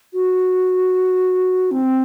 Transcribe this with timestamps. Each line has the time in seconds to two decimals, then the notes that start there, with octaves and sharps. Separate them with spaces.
0.13 F#4
1.71 C4